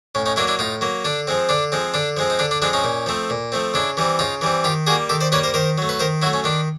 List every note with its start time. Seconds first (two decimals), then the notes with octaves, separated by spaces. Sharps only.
0.15 A2 C#4
0.26 C#4 D#4
0.36 F#3 A#3 D4 E4
0.48 D4 E4
0.59 A2 D#4 F4
0.81 F#3 A#3
1.05 D3 D4
1.27 F3 G#3 C4
1.49 D3 D4
1.72 F3 G#3 C4
1.94 D3 D4
2.17 F3 G#3 C4
2.30 D#4
2.39 D3 D4
2.51 D4
2.62 F3 G#3 C4 D4
2.73 C#4 D#4
2.84 A#2
3.06 F3 A3 C4
3.30 A#2
3.52 F3 A3 C4
3.74 C#3 D4 E4
3.97 E3 G3 C4
4.19 C#3 D#4 F4
4.41 E3 G3 C4
4.64 D#3 F4 G4
4.87 G3 F#4 G#4
4.90 A#3
5.09 D#3 G4 A4
5.21 C5 D5
5.32 G3 A#3 B4 C#5
5.43 A#4 C5
5.54 D#3 A#4 C5
5.78 F#3 A3
5.89 B4
5.99 D#3 A#4 C5
6.22 F#3 E4 F#4
6.26 A3
6.33 C#4
6.44 D#3 D4